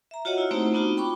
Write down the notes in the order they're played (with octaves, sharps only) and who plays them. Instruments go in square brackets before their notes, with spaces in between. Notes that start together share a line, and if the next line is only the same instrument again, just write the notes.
[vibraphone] E5 A#5
F4 F#4 C#5 D#5 F#5
E4 F4
A3 A#3 C4 D#4 G4 C5
A#3 B3 D4 D#4 F4 F#4
G5 B5 C#6 D6